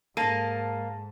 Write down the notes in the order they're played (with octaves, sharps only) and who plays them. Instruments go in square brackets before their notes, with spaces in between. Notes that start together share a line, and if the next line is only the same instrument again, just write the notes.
[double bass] G#2 [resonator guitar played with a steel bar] A#3 [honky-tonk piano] A5 D#7